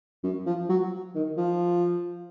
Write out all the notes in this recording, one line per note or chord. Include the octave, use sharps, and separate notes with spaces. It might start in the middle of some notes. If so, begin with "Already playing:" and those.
F#2
F3
F#3
D#3
F3